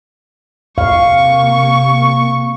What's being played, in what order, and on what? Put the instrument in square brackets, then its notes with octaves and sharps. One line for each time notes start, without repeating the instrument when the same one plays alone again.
[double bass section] C3 A#3 [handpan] F5 [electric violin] C#6